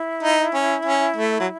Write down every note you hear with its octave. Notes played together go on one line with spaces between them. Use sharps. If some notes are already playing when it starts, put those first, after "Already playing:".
Already playing: E4
D#4
C#4
C#4
A3
F#3